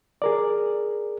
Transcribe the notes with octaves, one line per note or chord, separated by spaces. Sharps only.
G#4 A#4 D5